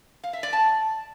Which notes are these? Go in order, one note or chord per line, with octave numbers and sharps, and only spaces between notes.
F5
E5
D5
A5